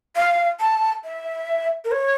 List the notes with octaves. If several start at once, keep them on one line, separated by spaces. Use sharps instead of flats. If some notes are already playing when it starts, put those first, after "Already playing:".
F5
A5
E5
A#4
C#5